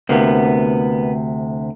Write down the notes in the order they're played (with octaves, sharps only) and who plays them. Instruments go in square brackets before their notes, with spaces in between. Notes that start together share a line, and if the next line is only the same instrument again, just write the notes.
[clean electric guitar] D2 C3 [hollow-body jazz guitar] A#3 B3